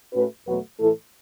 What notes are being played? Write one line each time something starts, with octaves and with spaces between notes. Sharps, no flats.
A2 A3 C#4 F#4 B4
E2 B2 F#3 A3 F#4 B4
A2 E3 A3 E4 A4